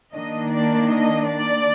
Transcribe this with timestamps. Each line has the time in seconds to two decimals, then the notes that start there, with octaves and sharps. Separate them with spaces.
0.14 D#3 A#3 D4 D#5
0.51 D5
0.90 D#5
1.27 D5